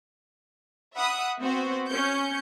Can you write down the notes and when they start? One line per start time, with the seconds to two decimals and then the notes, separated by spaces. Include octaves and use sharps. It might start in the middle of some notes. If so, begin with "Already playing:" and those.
0.95 E5 F#5 B5 D#6
1.40 B3 C4 F#4 C5
1.89 C#4 G6 C#7